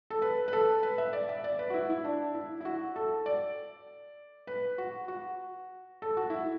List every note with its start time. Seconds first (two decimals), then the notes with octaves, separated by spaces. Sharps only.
0.10 A4
0.22 B4
0.48 B4
0.53 A4
0.83 B4
0.98 E5
1.13 D5
1.29 E5
1.44 D5
1.59 B4
1.70 F#4
1.74 E4
1.90 E4
2.04 D4
2.35 E4
2.61 E4
2.65 F#4
2.96 A4
3.26 D5
4.47 B4
4.78 F#4
5.08 F#4
6.02 A4
6.17 F#4
6.30 E4